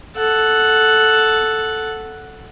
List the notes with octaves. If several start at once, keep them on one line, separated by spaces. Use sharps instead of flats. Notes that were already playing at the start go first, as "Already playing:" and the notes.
A4 F#5